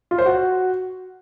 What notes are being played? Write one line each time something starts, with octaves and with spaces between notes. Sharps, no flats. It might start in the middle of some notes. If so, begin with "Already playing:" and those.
F4
C5
F#4